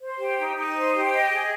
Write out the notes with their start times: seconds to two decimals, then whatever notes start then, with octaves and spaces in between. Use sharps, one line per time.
0.01 C5
0.19 G4
0.37 D#4
0.56 D#4
0.75 C5
0.94 G4
1.13 D#5
1.32 G#4